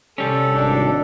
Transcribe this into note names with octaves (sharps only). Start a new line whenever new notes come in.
C2 G3 C#4 A4
G#1 D4